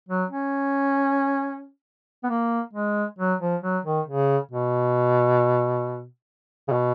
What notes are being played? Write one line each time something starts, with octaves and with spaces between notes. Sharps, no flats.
F#3
C#4
B3
A#3
G#3
F#3
F3
F#3
D#3
C#3
B2
C#3
B2